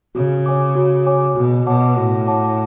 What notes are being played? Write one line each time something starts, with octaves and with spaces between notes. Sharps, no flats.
C#3 F#4
C#5 G#5 D6
F#4
C#5 G#5 D6
B2 F#4
B2 C#5 F#5 A5 D6
A2 F#4
C#5 F#5 A5 D6